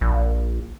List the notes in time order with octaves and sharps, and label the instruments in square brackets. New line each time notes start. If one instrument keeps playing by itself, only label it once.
[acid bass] A#1